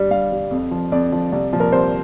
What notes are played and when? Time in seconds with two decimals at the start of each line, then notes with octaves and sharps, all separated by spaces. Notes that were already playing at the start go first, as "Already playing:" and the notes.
Already playing: G2 G3
0.10 G2 F5
0.32 G3
0.51 F2
0.71 F3
0.92 F2 D5
1.12 F3
1.32 C2
1.53 A#2 F3
1.60 A#4
1.72 C2 C5